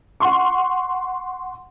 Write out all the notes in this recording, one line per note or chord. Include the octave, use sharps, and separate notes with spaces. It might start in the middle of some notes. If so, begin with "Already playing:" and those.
F#5 C6 C#6